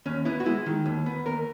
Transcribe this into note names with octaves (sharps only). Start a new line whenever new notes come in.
D#2 C#4
B3 E4
F#4
G#3 E4
D#3
D#2
B3
D#2 A#4